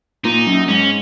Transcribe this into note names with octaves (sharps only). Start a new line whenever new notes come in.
A#2 D#4
F#2
G#2 C#4